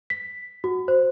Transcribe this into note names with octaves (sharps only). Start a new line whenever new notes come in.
B6
F#4
C5